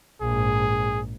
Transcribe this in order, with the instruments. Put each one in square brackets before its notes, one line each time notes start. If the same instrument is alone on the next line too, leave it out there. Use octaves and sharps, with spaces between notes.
[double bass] A#1 G#2 [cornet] G#4